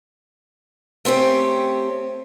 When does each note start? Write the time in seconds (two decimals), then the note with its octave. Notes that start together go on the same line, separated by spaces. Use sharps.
1.05 A3 C4 C#4 G4